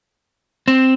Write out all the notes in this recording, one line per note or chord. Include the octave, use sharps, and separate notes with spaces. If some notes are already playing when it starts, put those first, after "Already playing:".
C4